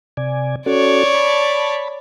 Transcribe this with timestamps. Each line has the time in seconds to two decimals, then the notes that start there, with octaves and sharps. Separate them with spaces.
0.17 C3 D5 G#5
0.66 C#4 F#4 A4 C#5 D5
1.15 A5 B5